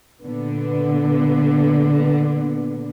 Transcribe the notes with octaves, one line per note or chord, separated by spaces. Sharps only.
A#2 D3 B3